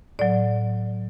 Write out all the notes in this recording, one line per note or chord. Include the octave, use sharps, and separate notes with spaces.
A2 F#3 D5